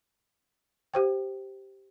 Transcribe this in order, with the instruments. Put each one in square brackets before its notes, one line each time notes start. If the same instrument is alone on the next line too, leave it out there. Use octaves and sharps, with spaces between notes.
[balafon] G4 C5 G5